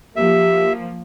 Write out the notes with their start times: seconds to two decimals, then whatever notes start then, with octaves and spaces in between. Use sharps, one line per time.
0.16 F3 A#3 G4 E5